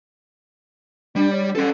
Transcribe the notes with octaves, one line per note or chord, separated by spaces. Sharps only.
G3 D4
C#5
C#4 A4 C6